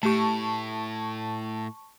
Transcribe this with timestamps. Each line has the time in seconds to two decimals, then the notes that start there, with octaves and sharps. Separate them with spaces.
0.03 A2 A3 G4 A5 C#6